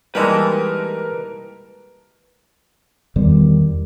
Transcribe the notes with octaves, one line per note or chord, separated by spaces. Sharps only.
E3 G3 G#3 A#3 D#4 A#4 B4 A5
E2 D#3 G3